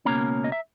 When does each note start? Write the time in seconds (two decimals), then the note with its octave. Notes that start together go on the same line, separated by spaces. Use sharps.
0.05 C#2 B2 A#3 C#4 A#5
0.44 D#5
0.52 E5